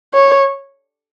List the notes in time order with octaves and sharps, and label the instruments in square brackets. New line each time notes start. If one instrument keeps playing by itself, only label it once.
[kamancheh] C#5